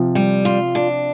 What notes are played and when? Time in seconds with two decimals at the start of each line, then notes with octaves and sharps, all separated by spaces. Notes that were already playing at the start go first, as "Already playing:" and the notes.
Already playing: C3 F3
0.15 G3
0.45 F4
0.75 D4